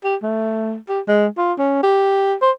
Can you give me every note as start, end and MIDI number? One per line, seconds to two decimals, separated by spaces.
0.04 0.16 67
0.23 0.76 57
0.89 1.00 67
1.08 1.27 56
1.37 1.53 65
1.58 1.83 61
1.83 2.34 67
2.42 2.51 72